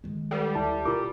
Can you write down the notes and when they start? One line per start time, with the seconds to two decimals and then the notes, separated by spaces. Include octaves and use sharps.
0.04 D#3 G#3
0.31 G3 A4 B4 F#5
0.55 D2 E4 A5
0.85 A#2 E4 F4 A#4 D6